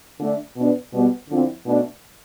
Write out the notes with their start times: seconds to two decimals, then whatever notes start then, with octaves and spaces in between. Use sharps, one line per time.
0.20 D3 A3 D4
0.57 B2 B3 D4
0.93 B2 G3 B3
1.30 D3 F3 C4 E4
1.66 B2 A3 D4